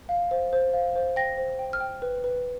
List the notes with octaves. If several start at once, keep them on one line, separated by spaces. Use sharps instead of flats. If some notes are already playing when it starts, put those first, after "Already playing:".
F5
C5
C5
F5
C5
G5 A#6
C5
G5
F6
G5
B4
B4